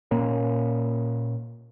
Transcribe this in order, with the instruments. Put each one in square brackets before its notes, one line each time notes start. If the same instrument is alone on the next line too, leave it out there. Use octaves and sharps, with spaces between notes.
[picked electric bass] A#2 A#3 C#4